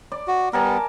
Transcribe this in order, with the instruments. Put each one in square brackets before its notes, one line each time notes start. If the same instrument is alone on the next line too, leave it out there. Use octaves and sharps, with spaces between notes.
[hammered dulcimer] D5
[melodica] F#4
[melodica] G3 B3 [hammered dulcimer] A#4 G#5 A5